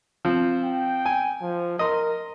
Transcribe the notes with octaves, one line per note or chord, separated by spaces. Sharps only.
F3 C4
G5
G#5
F3
A#4 D#5 C6